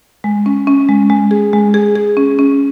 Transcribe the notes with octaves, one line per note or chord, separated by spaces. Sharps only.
G#3
C#4
C#4
G#3
G#3
G#4
G#3
G#4
G#4
C#4
C#4